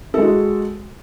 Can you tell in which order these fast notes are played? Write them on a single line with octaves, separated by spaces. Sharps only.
A4 G#3 F#4